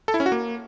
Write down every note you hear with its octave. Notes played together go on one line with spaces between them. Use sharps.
A4
E4
C#4
F#4
A#3